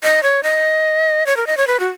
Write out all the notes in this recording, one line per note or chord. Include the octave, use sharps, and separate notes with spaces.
D#5
C#5
D#5
C#5
A#4
D#5
C#5
B4
F#4